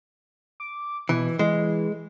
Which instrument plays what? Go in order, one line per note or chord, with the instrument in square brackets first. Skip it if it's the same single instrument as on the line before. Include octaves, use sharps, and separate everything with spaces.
[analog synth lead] D6
[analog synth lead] B2 [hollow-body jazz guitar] E3
[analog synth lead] E3 [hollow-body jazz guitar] G#3